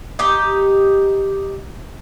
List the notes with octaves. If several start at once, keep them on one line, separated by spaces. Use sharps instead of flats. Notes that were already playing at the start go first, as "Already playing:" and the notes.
D#4 G4